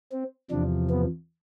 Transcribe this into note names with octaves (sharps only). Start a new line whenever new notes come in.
C4
E2 C3 F3 D4
B3